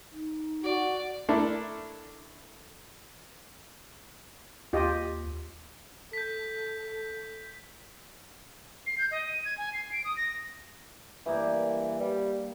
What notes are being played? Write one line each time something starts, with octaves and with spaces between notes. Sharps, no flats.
D#4
F#4 D5
A3 D4 E4 A4 A#4
D#2 F4 G4 D#5
A4 G6 B6
C7
G6
D#5
D#7
G#6
G#5
C7
D7
D#6
A#6
G2 E3 A#3 D6
G3